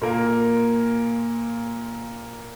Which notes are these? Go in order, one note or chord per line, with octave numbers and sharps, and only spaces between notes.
A#2 A#3 F4 A#4